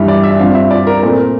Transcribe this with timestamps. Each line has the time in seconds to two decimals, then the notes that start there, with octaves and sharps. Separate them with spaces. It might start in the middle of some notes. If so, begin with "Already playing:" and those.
Already playing: G2 E3 G3 E4
0.08 D5
0.23 E5
0.40 G2 F3 C4 F5
0.54 E5
0.71 D5
0.87 A#4
1.02 A#2 A3 C4 A#4
1.18 A#4